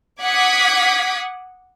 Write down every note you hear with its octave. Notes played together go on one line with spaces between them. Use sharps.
F#5 D6 D#6 G#6 B6